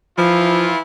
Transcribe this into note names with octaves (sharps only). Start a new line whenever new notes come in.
E3 F3 E4 F4